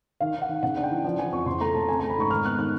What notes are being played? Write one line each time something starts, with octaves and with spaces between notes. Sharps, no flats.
D#3 F5
D#3
F#5
D#3
C#3 F#5
D4
G5
E3
F3 F#5
F3 G#5
F2 C#6
C#3 C6
A3 A#5
C#3 A5
C4 G#5
A#5
A3
B5
G#2 C#6
D#3 F6
B3 F#6
D#3 F#6